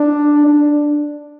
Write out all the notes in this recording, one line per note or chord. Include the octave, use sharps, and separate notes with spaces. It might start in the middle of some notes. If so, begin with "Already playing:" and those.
Already playing: D4
D4